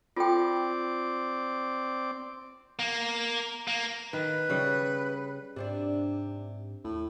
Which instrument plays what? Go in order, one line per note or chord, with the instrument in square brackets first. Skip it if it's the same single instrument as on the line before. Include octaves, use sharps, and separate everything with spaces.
[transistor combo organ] C4 D5 [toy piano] F4 A4 G5
[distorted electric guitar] A#3
A#3
[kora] D#3 [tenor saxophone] B4
[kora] C#3 G3
[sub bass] G#2 [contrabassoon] C3 [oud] D4 C5 D5
[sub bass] D#2 [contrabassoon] A2